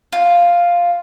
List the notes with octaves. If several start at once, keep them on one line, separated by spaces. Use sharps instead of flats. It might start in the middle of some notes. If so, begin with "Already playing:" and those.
F4